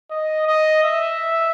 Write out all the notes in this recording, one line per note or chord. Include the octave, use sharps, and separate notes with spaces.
D#5
D#5
E5